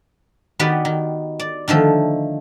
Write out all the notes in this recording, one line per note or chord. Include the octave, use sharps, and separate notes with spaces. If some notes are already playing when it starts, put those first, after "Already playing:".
D#3 B3 F#4 G4 B4 D5
D#3
D5
D3 D#3 F3 A3